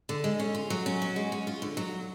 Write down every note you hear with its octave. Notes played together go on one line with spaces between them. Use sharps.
D3
G#3
C#4
F4
F#3
C#4
F#4
G#3
C#4
F4
D3
F#3